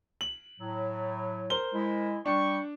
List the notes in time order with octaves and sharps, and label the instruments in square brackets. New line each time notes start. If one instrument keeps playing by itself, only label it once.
[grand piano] F#7
[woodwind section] A2 F#3
[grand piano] A#4 C5 G7
[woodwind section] G#3 E4
[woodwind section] G3 G5 C#6 [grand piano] D4